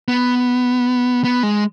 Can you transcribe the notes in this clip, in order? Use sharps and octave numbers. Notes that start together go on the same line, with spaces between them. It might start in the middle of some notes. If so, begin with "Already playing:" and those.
B3
B3
G#3